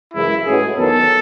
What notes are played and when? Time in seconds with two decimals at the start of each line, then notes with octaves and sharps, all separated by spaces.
0.14 F#2 C#3 E3 G#3 E4
0.45 A2 G#3 C#4 F#4 G#4 B4
0.77 E2 D#3 F#3 B3 A4